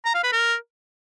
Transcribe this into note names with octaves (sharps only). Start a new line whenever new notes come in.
A#5
F5
B4
A#4